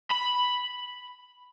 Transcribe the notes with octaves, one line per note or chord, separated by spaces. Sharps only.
B5